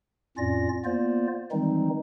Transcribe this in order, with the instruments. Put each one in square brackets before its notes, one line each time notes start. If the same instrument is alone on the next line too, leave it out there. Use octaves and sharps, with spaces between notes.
[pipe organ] F2 A2 C#4 F4 D5 A#6
A#3 B3 F4 C5 D5
D#3 E3 G3 G#3 C4 D#4